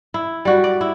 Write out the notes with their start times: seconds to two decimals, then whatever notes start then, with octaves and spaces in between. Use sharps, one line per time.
0.14 E4
0.45 G3 F#4
0.64 D5
0.81 E4